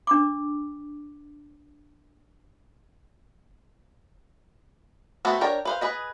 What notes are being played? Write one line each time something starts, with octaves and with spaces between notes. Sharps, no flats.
D4 D6
A3 B3 C4 F#4
D4 A#4 C#5 G5
B4 C5 F5
G#4 B4 D#5